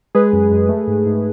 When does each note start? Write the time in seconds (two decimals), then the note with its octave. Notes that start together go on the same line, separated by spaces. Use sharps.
0.15 G#3 G#4 B4
0.33 F#2
0.51 F#2
0.69 A3
0.87 G#2
1.06 G#2